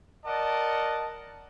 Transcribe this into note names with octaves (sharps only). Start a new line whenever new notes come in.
A#4 D5 D#5 F#5 A5